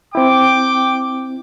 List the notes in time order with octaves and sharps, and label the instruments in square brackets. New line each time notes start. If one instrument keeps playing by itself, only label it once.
[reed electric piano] C4 E4 [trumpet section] G5 D6